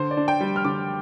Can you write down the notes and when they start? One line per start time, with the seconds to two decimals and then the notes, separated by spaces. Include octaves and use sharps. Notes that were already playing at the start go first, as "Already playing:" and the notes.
Already playing: D3 C5
0.11 D5
0.17 D4
0.28 G5
0.40 G3
0.56 F6
0.64 D3 D6